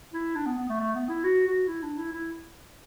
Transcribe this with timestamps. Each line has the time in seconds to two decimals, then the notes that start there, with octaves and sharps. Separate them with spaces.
0.13 E4
0.36 D4
0.46 B3
0.58 B3
0.69 A3
0.80 A3
0.95 B3
1.09 E4
1.24 F#4
1.47 F#4
1.67 E4
1.83 D4
1.98 E4
2.12 E4